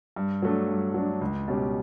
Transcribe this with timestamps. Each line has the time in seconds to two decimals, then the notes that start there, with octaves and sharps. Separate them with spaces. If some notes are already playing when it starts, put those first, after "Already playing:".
0.16 G2
0.42 F#3 A3 D4
0.68 G2
0.94 F#3 A3 D4
1.21 C#2
1.48 B2 G3 C#4 G4